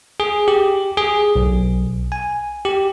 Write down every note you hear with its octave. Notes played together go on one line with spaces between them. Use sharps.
G#4
G4
G#4
B1
G#5
G4